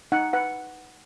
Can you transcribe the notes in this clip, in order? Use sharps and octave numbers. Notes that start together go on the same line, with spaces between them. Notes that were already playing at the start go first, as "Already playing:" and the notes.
D#4 F#5
B4 F#5